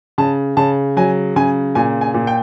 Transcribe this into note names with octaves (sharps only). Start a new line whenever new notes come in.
C#3 A5
C#3 A5
F#3 G#5
C#3 G#5
A#2 G#5
G#5
A#2
G5